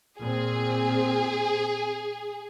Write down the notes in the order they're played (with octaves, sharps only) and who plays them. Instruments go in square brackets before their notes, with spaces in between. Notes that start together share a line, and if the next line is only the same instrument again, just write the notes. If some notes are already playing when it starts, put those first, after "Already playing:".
[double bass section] A#2 C4 [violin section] G#4